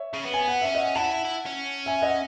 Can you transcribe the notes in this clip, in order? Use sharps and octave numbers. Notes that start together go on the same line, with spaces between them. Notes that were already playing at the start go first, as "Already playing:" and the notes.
Already playing: C#5 E5
C#3
B3
G#5
F#5
C#4 E5
D#5 F#5
E4 F#5 A5
E4
C#4
E5 G#5
D#5 F#5